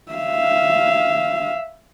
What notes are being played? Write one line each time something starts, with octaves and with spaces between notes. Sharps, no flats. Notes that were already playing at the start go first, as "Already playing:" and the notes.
E5 F5